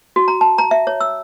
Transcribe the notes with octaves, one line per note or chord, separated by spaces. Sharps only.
F#4
A#5
A5
A#5
E5
C#5
E6